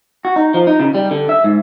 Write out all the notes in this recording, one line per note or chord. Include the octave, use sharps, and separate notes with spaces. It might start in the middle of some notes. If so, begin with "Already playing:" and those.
F#4
D#4
F3
D#4
C#3
G3
D3
E5
G#2